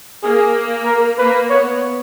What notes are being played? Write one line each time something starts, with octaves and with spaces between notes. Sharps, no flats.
A#3 G#4
A#4
A#3 B4
B3 C#5